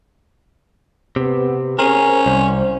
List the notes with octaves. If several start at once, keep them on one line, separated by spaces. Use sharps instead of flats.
C3 B3
C#4 G#4 A#4 C5
C2 C5